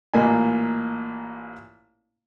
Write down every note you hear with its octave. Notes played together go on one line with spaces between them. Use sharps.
A1 A#2 A#3 D#5 G#5